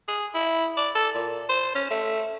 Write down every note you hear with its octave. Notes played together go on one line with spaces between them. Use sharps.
G#4
E4
D5
A4
A#2
C5
C#4
A3